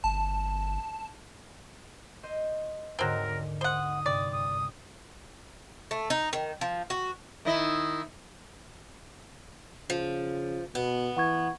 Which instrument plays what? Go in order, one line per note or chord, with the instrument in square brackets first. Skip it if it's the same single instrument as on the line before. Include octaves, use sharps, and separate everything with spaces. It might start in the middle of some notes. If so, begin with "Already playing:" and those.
[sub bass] G1 [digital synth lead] A5
[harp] C5 D#5
[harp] D#2 G#2 D3 [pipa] F#3 C4 [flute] A#4
[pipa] C5 F#5 [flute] D#6
[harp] G2 C3 [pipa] D5
[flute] D#6
[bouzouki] A3
D#4
D#3
F3
F#4
[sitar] D#3 E4 D#5
[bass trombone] C#3 [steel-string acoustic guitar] F3
[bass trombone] B2 [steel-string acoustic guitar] B3
[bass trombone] E3 [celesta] F#5 C#6 G#6